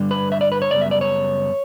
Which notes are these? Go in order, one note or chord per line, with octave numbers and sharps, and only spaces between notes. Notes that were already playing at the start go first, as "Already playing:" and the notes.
Already playing: G2 D3 G3
B4
E5
D5
B4
C#5
F#2 C#3 G3 B3 D5
E5
D5
C#5